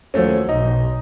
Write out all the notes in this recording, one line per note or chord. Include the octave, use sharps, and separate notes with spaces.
D#2 F3 F#3 A3 C#4
B1 D#4